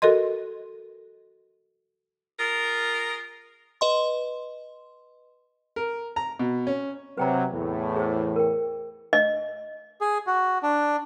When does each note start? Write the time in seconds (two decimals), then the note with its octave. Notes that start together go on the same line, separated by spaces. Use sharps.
0.02 F#4 A4 A#4 D#5 C6
2.40 F4 G#4 A#4
3.81 B4 D#5 C6
5.76 A#4
6.16 A#5
6.39 B2
6.67 C#4
7.17 C3 F#3 B4 G5 A#5
7.51 E2 A2
7.96 G#4 C5
8.36 A#4 G5
9.13 D#5
10.01 G#4
10.27 F#4
10.63 D4